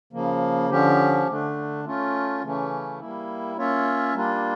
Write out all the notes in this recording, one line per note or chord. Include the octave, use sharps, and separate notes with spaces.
C#3 F3 A#3
D3 F3 C#4 G4
D3 A3 D4
A3 C#4 F4
C#3 E3 A3 C#4
G3 A#3 E4
A#3 C#4 F4 C#5 E5
G3 A#3 D4 F4